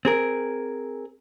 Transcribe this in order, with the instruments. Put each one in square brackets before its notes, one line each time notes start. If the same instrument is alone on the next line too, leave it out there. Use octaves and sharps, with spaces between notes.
[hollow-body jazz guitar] C4 G#4 A#4